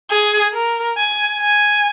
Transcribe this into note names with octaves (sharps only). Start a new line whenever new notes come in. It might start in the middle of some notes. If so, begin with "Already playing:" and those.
G#4
A#4
G#5
G#5